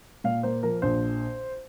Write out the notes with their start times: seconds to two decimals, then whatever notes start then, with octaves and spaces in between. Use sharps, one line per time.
0.24 A#2 F5
0.43 A#3 C5
0.63 F3 A#4
0.82 A#1 C5